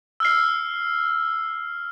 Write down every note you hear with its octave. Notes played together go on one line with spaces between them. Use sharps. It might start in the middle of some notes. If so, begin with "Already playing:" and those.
E6 F6 C7